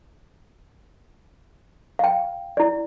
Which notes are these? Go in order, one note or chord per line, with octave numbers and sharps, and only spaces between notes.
F5 G5
E4 D5